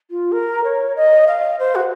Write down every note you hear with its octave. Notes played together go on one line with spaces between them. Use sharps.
F4
A#4
C#5
D#5
F5
C5
F#4